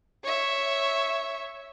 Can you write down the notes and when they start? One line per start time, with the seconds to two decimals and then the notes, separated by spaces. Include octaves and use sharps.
0.24 C#5 E5